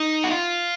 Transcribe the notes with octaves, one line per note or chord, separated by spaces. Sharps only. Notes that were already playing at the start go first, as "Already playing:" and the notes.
Already playing: D#4
F#4
F4